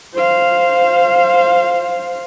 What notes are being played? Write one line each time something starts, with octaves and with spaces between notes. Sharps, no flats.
C5 F5